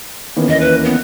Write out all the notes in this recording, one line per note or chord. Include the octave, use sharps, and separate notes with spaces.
D#3 E3 A#3 B3 C#4
D#2 D#5
B4
B3